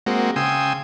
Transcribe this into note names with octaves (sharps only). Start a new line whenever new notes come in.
G#3 A#3 C4 F#4
C#3 G5 G#5 C6 D#6 E6